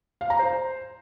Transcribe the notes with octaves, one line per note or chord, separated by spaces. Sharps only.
F5
A#5
C5